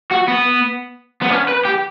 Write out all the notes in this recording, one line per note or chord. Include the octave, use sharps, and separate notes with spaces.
F#4
B3
B3
C#4
B4
G4